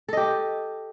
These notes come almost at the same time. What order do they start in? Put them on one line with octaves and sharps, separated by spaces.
A4 D#5 G4